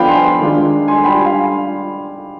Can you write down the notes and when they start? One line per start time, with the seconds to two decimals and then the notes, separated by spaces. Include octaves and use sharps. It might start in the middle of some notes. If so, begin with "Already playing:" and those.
Already playing: F3 B3 D4 F4 F5 G5 B5
0.08 G#5 C6
0.40 D#3 G#3 D4 F4
0.88 G#5 C6
1.04 G3 D4 F4 G5 B5
1.15 G#5 C6
1.26 F5 G#5